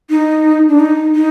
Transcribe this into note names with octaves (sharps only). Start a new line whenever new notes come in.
D#4
D4
D#4
D#4